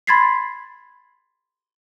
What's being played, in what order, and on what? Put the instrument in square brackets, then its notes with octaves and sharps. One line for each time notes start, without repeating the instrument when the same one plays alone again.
[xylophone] B5 C6 G#6 A6 B6 C7